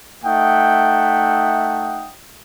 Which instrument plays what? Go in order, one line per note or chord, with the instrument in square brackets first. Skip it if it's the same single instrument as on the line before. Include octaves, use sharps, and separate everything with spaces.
[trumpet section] A3 D#4 E5 F#5 G5 D#6